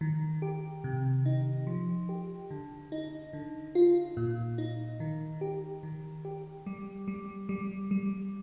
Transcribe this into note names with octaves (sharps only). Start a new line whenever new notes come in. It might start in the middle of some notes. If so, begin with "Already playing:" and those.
D#3
G4
C3
D#4
F3
G4
D3
D#4
D3
F4
A#2
D#4
D#3
G4
D#3
G4
G3
G3
G3
G3